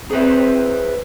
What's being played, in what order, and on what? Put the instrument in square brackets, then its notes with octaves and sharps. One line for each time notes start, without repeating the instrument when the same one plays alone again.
[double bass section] C4 [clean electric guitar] G#4 B4 E5